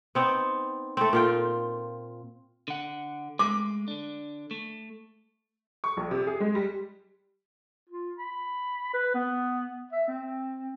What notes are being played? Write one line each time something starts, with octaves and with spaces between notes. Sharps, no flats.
B3 C4 D#4
A3 C4
A#2 F4 G5
D3 F#5
G#3 A3 D6
D3 D4
A3
C#6
A#1
C3
G#4
G#3
G3
F4
B5
B4
B3
E5
C4